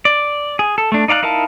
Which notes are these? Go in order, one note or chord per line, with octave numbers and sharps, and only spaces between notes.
D5
G#4
A4
A3 D4
D#4 D5 F5 A5 F#6
D#4 E4 A#4 F5 A5